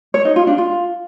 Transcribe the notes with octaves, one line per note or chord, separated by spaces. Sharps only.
C#5
D#4
F4
D4
F4